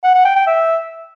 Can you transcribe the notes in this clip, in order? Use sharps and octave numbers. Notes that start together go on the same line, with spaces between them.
F#5
F#5
G5
G5
E5